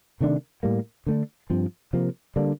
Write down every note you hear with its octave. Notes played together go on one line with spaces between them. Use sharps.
C3 D#3 A3 D4
A2 G3 A#3
D3 A3 D4
G2 F3 C4
C3 F3 A#3
D3 G3 A#3 D4